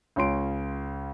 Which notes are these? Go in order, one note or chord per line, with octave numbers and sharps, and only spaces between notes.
C#2 C#4 F4 C6 D7